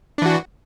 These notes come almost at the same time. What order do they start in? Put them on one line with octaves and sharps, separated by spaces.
D4 E3 F#4